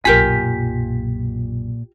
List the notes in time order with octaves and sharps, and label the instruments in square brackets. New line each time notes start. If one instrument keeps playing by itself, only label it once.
[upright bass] B1 F#2 [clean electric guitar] A#2 G#5 [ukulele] F4 G4 A#4 [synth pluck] B6